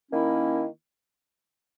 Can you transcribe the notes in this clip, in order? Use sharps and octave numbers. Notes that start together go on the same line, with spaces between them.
D#3 A#3 C#4 E4